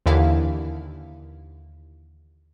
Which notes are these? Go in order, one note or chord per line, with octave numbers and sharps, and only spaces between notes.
D#2 D3 E3 E4 F5